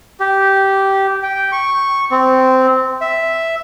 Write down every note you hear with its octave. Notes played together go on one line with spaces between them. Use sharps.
G4
G5
C#6
C4
E5